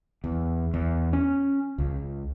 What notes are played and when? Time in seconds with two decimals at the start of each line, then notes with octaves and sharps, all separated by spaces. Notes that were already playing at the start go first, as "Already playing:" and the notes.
0.24 E2
0.74 E2
1.13 C#4
1.78 C#2